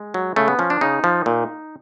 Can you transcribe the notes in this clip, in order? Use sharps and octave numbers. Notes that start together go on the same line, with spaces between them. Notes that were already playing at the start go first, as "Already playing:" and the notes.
Already playing: G#3
F#3
C#3 A3
B3
F3 C#4
D4
C#3 D#4
F3
A#2